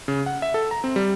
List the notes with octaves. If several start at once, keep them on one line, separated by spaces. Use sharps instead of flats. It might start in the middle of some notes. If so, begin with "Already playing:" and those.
C#3
F#5
E5
A4
A#5
C4
G3